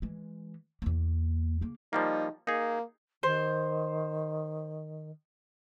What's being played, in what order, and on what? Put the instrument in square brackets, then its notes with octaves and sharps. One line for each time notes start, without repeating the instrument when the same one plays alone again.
[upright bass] E3 G#3
E2 A#3
C#3 A#3
[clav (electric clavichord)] F3 G3 A#3 [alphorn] D#4
[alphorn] A#3 [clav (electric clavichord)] D#4 G#4
[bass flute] D#3 [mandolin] C5